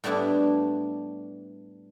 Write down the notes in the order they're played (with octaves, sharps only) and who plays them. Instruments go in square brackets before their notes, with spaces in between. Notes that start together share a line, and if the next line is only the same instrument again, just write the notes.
[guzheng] A2 G3 B3 D4 E4